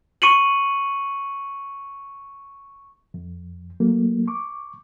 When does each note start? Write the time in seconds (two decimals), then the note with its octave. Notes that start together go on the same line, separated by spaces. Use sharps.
0.22 C#6 C#7 D#7 F#7
3.14 F2
3.80 F#3 A3 A#3
4.28 C#6 D6